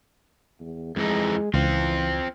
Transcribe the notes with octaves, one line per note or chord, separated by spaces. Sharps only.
E2
F2 E3 G#3 D#4
C#2 E3 C4 F4